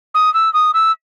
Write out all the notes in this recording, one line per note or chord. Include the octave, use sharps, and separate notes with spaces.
D#6
E6
D#6
E6